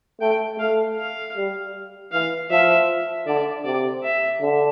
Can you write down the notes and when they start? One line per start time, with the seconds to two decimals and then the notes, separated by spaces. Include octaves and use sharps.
0.21 A3 G5
0.59 A3 F5
0.97 F5
1.36 G3
2.12 E3 F5
2.50 F3 E5
3.27 D3 D5
3.65 C3 D5
4.03 E5
4.41 D3